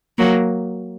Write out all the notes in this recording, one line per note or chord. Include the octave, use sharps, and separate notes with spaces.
F#3 A#3